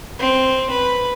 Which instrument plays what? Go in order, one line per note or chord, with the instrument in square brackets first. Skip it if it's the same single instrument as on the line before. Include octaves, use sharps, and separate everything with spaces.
[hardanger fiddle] C4
B4